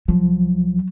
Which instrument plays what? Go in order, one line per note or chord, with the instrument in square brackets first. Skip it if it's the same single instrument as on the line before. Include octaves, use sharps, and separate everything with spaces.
[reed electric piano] C2 F3 [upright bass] F#3